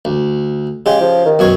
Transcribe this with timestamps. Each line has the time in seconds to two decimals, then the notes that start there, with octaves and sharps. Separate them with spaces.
0.05 D2
0.86 C#3 G#3 G4
1.01 F3
1.25 D#3
1.39 F#2 B2 C#5